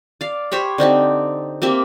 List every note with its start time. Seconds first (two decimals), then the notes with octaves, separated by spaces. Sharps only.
0.21 D5 F5
0.52 G4 C5 C#5 B5
0.78 D3 C4 D#4 G4
1.62 A#3 C4 G4 E5